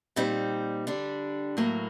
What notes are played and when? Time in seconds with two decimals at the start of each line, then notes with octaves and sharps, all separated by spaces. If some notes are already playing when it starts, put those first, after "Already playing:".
0.16 A#2 G3 C4 D#4
0.87 D3 G3 D4
1.57 A2 F#3 A#3